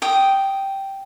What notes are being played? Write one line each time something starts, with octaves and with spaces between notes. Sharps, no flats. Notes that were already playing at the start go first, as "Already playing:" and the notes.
G5 D#6